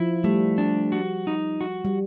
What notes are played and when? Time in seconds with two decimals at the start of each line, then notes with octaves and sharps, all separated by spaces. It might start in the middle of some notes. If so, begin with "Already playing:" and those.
Already playing: F3 E4
0.24 G3 A3
0.58 D4
0.92 F#4
1.27 D#4
1.61 F#4
1.85 G3